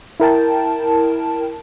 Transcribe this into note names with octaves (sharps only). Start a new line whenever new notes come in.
E4 A#4 G5 A5